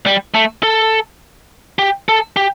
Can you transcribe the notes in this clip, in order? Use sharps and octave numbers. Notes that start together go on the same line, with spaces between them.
G3
A3
A4
G4
A4
G4